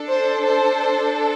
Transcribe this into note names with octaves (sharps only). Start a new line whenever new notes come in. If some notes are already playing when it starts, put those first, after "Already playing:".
Already playing: D4 A4
C5
C5